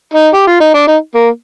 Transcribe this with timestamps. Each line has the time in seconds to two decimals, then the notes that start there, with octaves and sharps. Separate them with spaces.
0.14 D#4
0.34 G4
0.47 F4
0.60 D#4
0.74 D4
0.87 D#4
1.14 A#3